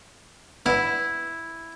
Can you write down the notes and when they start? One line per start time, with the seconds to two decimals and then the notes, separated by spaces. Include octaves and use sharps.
0.66 B3 E4 D5 A5